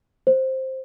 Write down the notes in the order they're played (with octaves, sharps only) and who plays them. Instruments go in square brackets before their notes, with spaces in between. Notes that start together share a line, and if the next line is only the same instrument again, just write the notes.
[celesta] C5